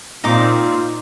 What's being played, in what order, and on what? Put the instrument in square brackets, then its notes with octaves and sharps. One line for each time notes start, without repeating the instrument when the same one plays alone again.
[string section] A#2 C4 [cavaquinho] D#4 D6 [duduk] F4